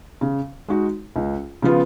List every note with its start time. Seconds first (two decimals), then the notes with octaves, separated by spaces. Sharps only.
0.21 C#3
0.69 G#3 D#4 F#4
1.16 C#2
1.62 C#3 F3 B3 F4